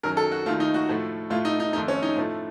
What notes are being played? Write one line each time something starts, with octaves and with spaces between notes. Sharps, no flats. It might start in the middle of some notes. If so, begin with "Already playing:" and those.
F#2 D#3 F#3 A#4
A4
F#4
D#2 D#3 A3 F4
D#4
F#4
A2 F3 A3
A2 A3 F4
D#4
D#4
F2 D#3 A3 D#4
C#4
D#4
A2 F3 A3